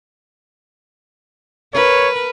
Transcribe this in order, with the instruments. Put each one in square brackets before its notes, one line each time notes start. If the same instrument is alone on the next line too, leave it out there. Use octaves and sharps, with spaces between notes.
[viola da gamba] A#4 B4 [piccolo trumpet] C#5